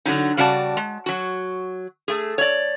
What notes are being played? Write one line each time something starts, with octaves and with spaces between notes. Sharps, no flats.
D3 F#3 D#4
C#3 G3 F#4 D5 A5
G#3
F#3 F#4
A3 G#4
C#5 D5